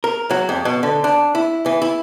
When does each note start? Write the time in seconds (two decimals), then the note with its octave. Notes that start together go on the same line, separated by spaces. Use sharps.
0.04 A#4
0.31 F#3
0.49 F2
0.65 B2
0.83 D3
1.04 D4
1.35 E4
1.66 E3
1.82 E4